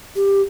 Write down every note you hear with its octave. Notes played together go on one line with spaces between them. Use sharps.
G4